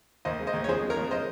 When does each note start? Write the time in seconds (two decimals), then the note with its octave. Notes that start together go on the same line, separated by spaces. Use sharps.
0.25 D#2 C5 D#5
0.40 G#3
0.47 C5 D#5
0.53 D#2
0.64 C#5
0.68 F2 G#4 C5
0.83 G#3
0.90 A#4 C#5
0.97 F2
1.11 C5 D#5